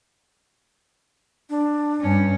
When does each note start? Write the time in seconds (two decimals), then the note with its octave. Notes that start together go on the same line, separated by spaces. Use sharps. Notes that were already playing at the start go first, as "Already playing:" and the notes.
1.50 D4
2.01 G2 C#4